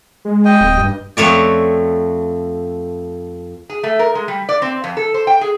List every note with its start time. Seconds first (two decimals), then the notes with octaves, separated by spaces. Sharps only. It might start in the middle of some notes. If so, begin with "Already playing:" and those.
0.25 G#3
0.45 D#5 G5
0.61 D1
0.78 G2
1.17 F2 A3 C#5 D5
3.70 G#4
3.84 A3
3.99 A#4
4.15 G#3
4.28 G3
4.49 D5
4.62 C4
4.84 F2
4.97 A4
5.14 C5
5.27 G5
5.41 G#4